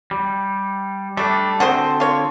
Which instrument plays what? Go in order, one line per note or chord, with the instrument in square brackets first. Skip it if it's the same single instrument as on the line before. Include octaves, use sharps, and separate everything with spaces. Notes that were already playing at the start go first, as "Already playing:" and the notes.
[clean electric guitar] G3
[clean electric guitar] G3 D4 [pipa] A3
[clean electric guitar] D3 C4 [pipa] F#4 G#4 C5
[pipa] F4 C#5